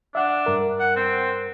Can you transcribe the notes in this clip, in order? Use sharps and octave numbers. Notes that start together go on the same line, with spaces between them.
D4 E5 F#5
G2 A#4
F#5
C4